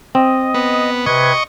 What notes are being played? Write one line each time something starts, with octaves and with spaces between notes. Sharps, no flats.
C4 D#5
B3
C3 B4 D#5 C#6 G#6